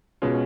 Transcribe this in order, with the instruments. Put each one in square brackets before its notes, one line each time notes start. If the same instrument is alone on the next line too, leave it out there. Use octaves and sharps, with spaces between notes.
[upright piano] B2 G#3 C#4 F4